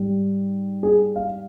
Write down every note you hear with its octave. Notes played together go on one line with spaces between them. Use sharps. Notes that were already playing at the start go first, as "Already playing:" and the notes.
Already playing: G#2 G3
G#4
F5